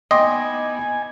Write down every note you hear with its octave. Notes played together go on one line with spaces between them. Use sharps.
B3 D#4 E4 D#5 G5 G#5 C6 D6